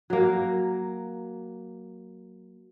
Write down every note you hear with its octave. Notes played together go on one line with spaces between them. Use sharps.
F#3 A#3